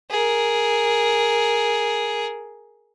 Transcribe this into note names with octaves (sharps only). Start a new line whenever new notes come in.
G#4 A#4